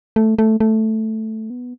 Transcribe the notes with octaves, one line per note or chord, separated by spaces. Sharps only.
A3
A3
A3
B3